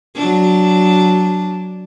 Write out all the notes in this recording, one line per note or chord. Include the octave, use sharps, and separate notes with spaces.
F#3 D4